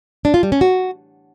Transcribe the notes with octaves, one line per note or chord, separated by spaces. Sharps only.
D4
F4
G3
C#4
F#4